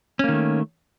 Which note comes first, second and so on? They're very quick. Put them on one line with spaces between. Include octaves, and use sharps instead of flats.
C#4 A#3 D#3 A3